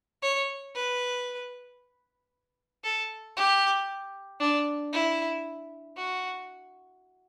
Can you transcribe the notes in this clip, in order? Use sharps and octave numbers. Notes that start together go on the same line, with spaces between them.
C#5
B4
A4
G4
D4
E4
F#4